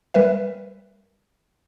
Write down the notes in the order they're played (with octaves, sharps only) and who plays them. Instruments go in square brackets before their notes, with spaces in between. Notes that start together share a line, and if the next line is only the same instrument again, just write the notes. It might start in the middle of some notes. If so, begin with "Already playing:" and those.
[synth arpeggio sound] G3 A#4 B4 E5